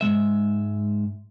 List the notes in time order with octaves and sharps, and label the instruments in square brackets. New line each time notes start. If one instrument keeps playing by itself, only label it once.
[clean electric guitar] G#2 D#3 G#3 E5